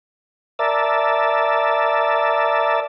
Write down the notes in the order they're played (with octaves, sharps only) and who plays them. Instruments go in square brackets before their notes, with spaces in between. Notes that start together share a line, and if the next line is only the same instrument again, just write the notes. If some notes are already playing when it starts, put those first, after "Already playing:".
[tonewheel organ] A#4 D5 E5 A5